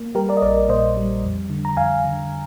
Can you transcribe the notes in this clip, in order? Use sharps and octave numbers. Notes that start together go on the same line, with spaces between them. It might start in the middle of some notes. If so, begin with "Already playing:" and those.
Already playing: A#3
G3 G4 A#4
A#4 D5
D#5
A#1 A#4 D5
A#2 C5 D#5
G3
F2
D3
A#5
F2 F5 G#5
D3